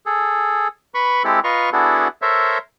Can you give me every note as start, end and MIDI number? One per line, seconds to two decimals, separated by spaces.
0.06 0.68 68
0.06 0.68 69
0.94 1.23 71
0.94 1.23 83
0.94 1.23 85
1.24 1.40 56
1.24 1.40 60
1.24 1.40 64
1.24 1.40 67
1.24 1.40 69
1.44 1.70 65
1.44 1.70 71
1.44 1.70 75
1.44 1.70 82
1.44 1.70 84
1.44 1.70 85
1.73 2.08 59
1.73 2.08 62
1.73 2.08 64
1.73 2.08 66
1.73 2.08 68
1.73 2.08 69
2.22 2.58 69
2.22 2.58 70
2.22 2.58 72
2.22 2.58 73
2.22 2.58 76